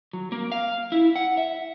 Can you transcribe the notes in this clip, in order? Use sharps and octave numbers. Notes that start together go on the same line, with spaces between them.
F#3
A#3
F5
E4
F#5
E5